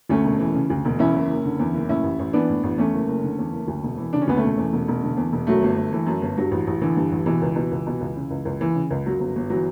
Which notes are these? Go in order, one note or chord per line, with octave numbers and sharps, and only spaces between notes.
D2 A3 C#4
E1
E3
C#3
D2
E1
E2 C#4 E4
F#1
F#1
D3
E2
F#1
A2 C#4 E4
A1
A1
E3 B3 D4
A2
A1
E2 A3 C#4
F#1
F#1
D3
E2
F#1
D2
E1
E3
C#3 D4
C#4
D2 B3
A3 C#4
E1
E2
E1
E1
D3
E2
E1
F#2 F#3 A3
G1
G1
E3
F#2
G1
G2 F#3
A1
A1
D3 E3
G2
A1
B2 E3
C#2
B2
C#2
B2
C#2
C#3
C#2
C#2
E3
C#3
C#2
F#2 F#3
G1
G1
E3 F#3